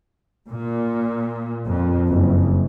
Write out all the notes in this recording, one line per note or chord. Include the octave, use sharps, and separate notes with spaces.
A#2
F2
F#1